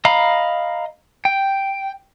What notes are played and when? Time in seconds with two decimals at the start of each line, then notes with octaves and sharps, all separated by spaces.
0.05 D#5 F5 A#5 B5
1.25 G5